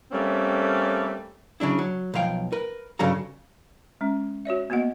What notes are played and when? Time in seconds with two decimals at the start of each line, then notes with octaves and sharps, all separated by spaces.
0.12 G3 A3 A#3 C4 C#4
1.60 C#3 F#3 D4 E4
1.79 F#3
2.14 B1 F3 F5 G5
2.52 A#4 B4
2.99 G2 C#3 F#3 A4 F5 A#5
4.01 G#3 C#4
4.45 F#4 C#5 D5 E5
4.70 A#3 B3 F#4 D#5 F#5